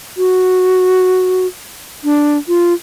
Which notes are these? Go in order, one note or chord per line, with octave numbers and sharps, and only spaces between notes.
F#4
D4
F4